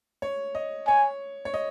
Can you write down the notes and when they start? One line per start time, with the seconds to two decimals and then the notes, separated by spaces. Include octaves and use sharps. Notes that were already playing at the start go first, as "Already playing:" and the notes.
0.22 C#5
0.55 D#5
0.87 C#5 G#5
1.45 C#5
1.54 D#5